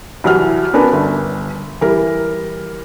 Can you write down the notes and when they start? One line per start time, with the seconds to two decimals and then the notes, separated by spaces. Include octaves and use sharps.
0.24 C2 E3 F#3 G3 F#5 F6
0.73 B3 C#4 D4 A#4 B4
0.93 G1
1.81 E3 G3 G4 A#4